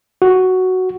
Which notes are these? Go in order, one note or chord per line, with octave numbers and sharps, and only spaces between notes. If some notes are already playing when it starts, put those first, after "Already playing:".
F#4